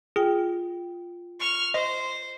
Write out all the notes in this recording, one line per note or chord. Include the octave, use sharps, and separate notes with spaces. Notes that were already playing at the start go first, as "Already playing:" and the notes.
F4 G#4 G5
C#6 F6
C5 D#5